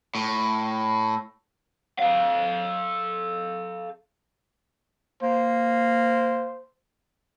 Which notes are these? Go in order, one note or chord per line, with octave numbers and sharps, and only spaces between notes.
A2
A4 F5
A#3 C5